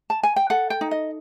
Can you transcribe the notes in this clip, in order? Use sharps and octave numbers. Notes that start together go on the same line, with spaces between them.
A5
G#5
G5
A4 F#5
G5
D#4
D#5